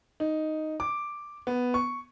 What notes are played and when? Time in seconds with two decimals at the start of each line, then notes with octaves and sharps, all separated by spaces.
0.20 D#4
0.80 D6
1.47 B3
1.74 C#6